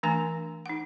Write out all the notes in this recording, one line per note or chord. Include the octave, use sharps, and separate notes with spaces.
E3 A3 D4 G#5 A#5
D#4 F#5